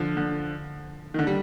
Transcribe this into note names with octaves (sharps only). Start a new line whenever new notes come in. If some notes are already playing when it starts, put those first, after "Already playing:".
Already playing: D3 F3
D3
D#3
D3
G3